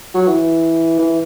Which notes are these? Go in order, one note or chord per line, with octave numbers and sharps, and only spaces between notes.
F#3
E3
E3